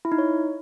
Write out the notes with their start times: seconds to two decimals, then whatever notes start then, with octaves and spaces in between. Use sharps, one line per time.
0.05 E4
0.12 D#4
0.18 C#5